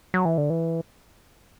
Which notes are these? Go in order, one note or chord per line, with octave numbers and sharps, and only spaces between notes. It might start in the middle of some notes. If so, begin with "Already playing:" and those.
F#3
E3
D3
E3